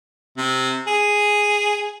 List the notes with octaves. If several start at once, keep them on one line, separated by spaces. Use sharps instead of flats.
C3
G#4